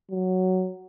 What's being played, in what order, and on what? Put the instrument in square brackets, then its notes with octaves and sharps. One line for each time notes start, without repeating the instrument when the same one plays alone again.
[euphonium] F#3